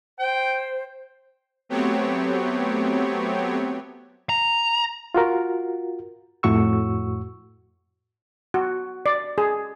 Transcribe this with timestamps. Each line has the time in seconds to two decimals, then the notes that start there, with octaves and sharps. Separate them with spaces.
0.19 C5 G5
1.69 F#3 A3 B3 C4 G4 C#5
4.29 A#5
5.15 F4 F#4 A#4
6.43 F2 A2 F#4 C#6 E6
8.54 F#4
9.06 D5
9.38 G#4